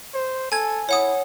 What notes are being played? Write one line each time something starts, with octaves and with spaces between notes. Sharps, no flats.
C5
A4 G#5 G#6
E4 C#5 F#5 D#6